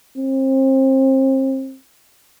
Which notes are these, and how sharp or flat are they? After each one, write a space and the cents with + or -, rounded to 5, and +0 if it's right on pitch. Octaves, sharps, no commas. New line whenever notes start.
C4 +30